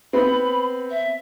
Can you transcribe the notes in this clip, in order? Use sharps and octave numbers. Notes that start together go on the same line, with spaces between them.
B3 C4 B5
E5